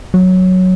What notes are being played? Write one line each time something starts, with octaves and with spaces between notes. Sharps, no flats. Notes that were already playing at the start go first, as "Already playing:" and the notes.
F#3